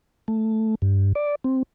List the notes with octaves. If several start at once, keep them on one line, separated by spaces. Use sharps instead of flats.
A3
G2
D5
C4